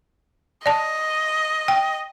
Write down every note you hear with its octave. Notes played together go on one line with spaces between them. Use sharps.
D5 D#5 A5
G5